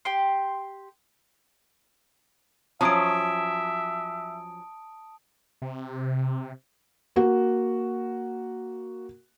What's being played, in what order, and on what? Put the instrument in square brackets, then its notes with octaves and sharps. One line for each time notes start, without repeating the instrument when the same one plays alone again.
[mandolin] G4 G5 C6
[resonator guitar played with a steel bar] F3 F#3 C#4 [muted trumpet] E5 [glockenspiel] A5 D#6 D7
[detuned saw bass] C3
[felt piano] A#3 F#4